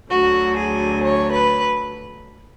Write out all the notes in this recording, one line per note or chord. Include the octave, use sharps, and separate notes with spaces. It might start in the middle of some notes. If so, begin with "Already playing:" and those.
D2 D3 F#3 F#4
G#4
C#5
B4